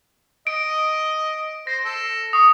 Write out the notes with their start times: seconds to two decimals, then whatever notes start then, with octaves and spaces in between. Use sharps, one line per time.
0.47 D#5 D7
1.67 C5 A#6
1.85 A4
2.33 C#6 D#6